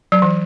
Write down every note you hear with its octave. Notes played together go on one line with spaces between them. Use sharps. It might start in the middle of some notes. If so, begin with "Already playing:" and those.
F#3
E3